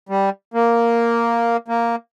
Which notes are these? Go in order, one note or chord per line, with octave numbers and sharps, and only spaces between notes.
G3
A#3
A#3